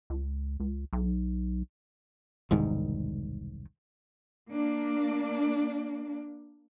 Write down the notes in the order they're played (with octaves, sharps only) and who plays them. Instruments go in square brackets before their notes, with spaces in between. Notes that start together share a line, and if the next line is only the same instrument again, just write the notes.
[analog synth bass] C#2
C#2
B1
[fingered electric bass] E1 C2 G#2 D#3
[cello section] A#3 D4